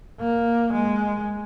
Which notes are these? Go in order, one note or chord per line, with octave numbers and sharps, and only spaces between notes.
A#3
G#3